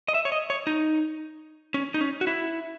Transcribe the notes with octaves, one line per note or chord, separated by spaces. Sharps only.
D#5
E5
C#5
D#5
C#5
D#4
C#4
D#4
C#4
F#4
E4